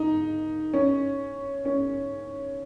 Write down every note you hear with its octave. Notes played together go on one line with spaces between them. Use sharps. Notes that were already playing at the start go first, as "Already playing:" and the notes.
Already playing: D#4
C#4
C#4